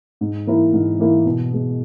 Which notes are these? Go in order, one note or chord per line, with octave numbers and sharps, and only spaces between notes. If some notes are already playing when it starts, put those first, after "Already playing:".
G#2
E3 A#3 E4 A#4
G#2
E3 A#3 E4 A#4
B2
G#3 B3